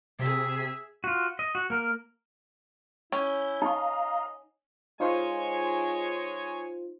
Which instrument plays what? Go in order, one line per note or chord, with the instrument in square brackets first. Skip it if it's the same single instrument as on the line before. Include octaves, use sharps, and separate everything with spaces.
[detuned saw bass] C3 [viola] G#4 E5
[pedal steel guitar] F4 F#4
D#5
F#4
A#3 A#4
[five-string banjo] C#4 [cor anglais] E4 [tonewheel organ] G6
[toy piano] D#4 C#6 [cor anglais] D#5 [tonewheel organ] F5 A#5
[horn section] G#3 C#5 G#5 [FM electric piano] D#4 F4 C5